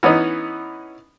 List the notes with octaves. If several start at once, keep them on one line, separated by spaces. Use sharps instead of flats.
E3 B3 C#4 D#4